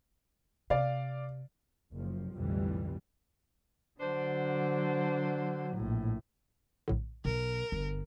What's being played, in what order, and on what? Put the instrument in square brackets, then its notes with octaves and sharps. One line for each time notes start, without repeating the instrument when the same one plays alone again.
[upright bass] C3 [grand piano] D5 F5
[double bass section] F#1 F3
B1 F2 A2 D3 E3 G3
[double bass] D3 F#3 [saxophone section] D4 C5
[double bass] A#1 A2
[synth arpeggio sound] A#1 A2 D3
[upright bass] B1 B2 [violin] A#4
[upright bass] G1